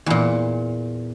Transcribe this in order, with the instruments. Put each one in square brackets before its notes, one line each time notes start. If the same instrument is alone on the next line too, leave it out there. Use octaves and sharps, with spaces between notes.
[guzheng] E2 A#2